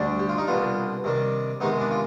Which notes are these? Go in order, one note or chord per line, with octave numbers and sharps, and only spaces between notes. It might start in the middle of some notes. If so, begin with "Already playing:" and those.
Already playing: D2 D3 G3 D4
G4
F4
D#4
C2 B2 B3 D4 F4
C3 D#3 G3 D4
C3 D#3 G#3 B3 D#4
D4
F4